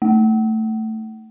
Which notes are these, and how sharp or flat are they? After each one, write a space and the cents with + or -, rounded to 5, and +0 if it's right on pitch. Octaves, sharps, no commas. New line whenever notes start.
A3 +10